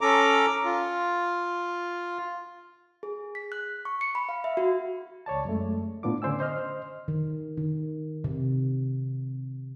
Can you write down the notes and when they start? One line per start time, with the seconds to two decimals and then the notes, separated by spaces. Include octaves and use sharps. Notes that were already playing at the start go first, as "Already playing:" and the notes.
0.01 C#4 A4 A#5 D6
0.65 F4
3.03 G#4
3.35 B6
3.52 F#6
3.85 C#6
4.01 C#7
4.15 B5
4.29 F5
4.44 E5
4.57 F#4
5.26 C#2 C#5 D5 A5
5.45 F#2 G#3 A3
6.03 A2 B3 D4 F4 D6
6.22 D3 C#4 C5 D5 G#5 E6
6.40 C5 D#5 F6
7.08 D#3
7.57 D#3
8.24 C3